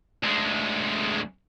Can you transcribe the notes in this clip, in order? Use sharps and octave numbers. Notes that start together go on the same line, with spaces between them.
D2 G#3